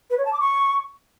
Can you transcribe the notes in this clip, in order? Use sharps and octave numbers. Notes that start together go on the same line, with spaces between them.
B4
C#5
A5
D6
C#6